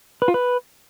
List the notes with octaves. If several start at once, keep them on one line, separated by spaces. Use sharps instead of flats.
B4
F4
B4